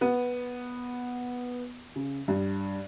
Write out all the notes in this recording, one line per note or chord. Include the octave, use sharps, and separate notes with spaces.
B3
C#3
G2